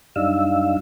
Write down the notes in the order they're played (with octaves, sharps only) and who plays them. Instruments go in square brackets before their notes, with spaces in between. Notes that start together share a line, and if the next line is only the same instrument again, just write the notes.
[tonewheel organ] F#2 G3 D4 D#4 F5 E6